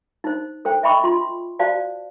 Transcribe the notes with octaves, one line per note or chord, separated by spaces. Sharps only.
D#4 C5
A4 C5 G5
D#5 E5 G5 B5 C#6 D6
F4 C6
F#4 C5 D5 F5 A5